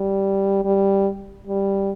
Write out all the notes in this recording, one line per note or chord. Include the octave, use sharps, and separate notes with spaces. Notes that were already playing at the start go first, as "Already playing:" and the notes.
Already playing: G3
G3
G3